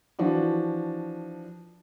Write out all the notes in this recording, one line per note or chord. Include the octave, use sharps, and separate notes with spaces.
E3 F3 D4 F#4